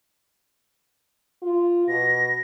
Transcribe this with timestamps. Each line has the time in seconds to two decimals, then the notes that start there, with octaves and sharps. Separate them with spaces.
1.42 F4
1.88 B2 A#6